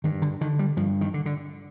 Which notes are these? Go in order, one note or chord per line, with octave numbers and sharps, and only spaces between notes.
G2 D#3
D3
D3 D#3
G3
G2 F3
D#3
D3
D3